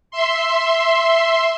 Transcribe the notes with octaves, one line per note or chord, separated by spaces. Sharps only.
E5 C6